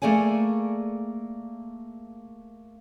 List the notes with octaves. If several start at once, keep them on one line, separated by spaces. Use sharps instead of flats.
A3 A#3 G#4 D5 G#5